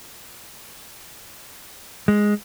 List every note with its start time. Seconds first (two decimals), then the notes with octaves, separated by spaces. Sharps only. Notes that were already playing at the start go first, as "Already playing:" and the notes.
2.08 G#3